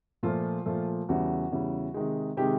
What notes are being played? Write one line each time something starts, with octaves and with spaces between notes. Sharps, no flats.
A#2 F3 A3 F4
A#2 F3 A3
E2 C#3 E3 G3 F#4
E2 C#3 E3 G3
C3 D#3 G#3
C3 D#3 G#3 G4